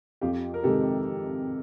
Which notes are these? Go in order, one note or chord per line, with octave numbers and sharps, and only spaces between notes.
F2 F4 G4
A#4
C3 D#3 G#3 G4 A4